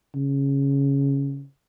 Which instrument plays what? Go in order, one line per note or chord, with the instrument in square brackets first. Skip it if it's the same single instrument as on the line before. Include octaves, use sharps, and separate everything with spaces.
[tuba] C#3